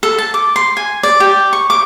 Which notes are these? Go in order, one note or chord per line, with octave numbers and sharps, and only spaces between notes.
A4
A5
D6
C6
G#5
D5
G4
C#6
D6